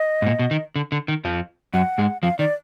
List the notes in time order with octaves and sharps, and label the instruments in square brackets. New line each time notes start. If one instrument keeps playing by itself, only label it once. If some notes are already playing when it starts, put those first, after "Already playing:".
Already playing: [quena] D#5
[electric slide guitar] G#2
A#2
B2
D#3
D3
D3
D#3
F2 F3
[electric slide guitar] F#2 F#3 [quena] F#5
[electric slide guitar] G#2 G#3
[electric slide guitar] F2 F3 [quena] F5
[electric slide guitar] D#3 [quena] D5